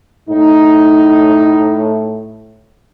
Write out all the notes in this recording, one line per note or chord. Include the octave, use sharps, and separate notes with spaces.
A2 D#4